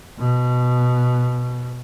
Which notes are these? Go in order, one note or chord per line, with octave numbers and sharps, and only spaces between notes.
B2